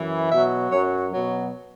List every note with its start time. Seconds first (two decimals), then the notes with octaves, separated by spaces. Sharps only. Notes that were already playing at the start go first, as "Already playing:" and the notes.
Already playing: F#2 E3
0.32 B2 F#3 E5
0.72 F#2 F#3 C#5
1.11 B2 F#3